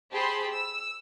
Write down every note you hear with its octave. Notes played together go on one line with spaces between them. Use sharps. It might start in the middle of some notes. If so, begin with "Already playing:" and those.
G4 G#4 C5 A5 B5 C6
E6